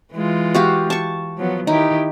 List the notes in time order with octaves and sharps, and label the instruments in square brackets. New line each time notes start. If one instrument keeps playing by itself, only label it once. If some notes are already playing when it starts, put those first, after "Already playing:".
[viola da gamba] E3 G#3 F4
[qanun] F#4 G4 F5
A5 C#6
[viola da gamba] F3 F#3 B3
[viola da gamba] D#3 E4 G4 [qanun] D#4